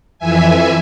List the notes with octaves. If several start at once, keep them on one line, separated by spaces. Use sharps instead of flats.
F2 E3 E5 G#5